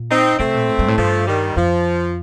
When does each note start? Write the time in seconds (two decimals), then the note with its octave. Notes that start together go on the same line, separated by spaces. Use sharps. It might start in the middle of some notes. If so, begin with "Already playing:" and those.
Already playing: A#2
0.11 C4 D#4
0.39 C3 A3 C4
0.55 A#2
0.69 A2
0.79 G2
0.88 A2
0.98 G2 F3 A3
1.27 D#3 G3
1.56 F2 F3